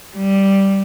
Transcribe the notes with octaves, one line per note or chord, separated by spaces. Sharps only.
G3